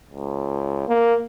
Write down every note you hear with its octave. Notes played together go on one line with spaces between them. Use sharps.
C#2
A#3